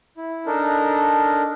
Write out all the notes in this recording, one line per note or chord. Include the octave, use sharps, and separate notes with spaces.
E4
D4 D#4 A4 A#4